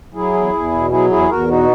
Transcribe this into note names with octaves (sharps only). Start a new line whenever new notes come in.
F#3 E4 G#4
E2
E2
B2
F#3 E4 G#4
E2 E4 G#4
E2 F#4 A#4
B2 D#4 F#4